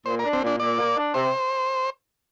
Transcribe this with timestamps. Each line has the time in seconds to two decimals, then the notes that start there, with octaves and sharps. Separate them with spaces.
0.05 A#2 C5
0.19 A#4
0.24 D4
0.33 C4
0.42 A#2
0.47 D4
0.60 A#2 D5
0.78 A#3
0.96 D4
1.14 C3 C5